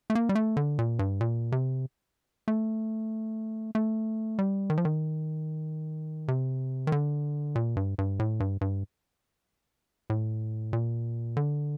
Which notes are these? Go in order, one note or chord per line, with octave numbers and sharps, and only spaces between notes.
A3
A#3
G3
A3
D3
A#2
G2
A#2
C3
A3
A3
G3
D#3
F3
D#3
C3
D#3
D3
A#2
G2
G2
A2
G2
G2
A2
A#2
D3